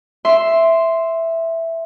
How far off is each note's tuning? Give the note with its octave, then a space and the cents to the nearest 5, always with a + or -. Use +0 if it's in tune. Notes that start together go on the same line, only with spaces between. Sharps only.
E5 +0 C6 +0